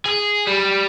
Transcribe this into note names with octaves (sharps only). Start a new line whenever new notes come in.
G#4
G3